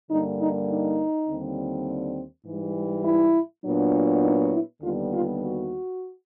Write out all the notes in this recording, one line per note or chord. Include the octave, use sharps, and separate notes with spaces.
G2 D3 G3 A#3 D#4
D#4
D#4
D#2 D3 G3 C4
G#2 E3 G3
E4
A#2 F#3 B3 D4
D#4
E4
D#2 D3 G3 B3 F4
F4
F#4